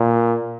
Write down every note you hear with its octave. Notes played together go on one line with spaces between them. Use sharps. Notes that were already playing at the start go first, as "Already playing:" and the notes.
Already playing: A#2